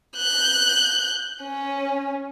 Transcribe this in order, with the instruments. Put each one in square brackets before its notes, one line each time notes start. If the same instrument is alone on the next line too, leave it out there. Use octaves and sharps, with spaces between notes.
[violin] F#6 G6
C#4